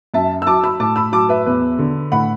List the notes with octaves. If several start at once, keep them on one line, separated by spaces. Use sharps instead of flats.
F#2 E5 A5
E6
F#3 A5 D6
B5 E6
A2 A5 D6
B5 E6
F#3 A5 D6
B4 E5
E2 B4
D3
A2 F#5 B5